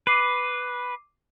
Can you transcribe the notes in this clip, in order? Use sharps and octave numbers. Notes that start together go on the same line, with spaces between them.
B4 D6 C7 D#7